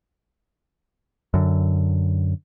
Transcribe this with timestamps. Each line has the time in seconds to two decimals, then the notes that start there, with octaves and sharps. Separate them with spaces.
1.34 F#2 D3